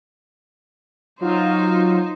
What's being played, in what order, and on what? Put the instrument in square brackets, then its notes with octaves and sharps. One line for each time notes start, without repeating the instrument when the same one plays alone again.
[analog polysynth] F#3 F4 [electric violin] D#4 C5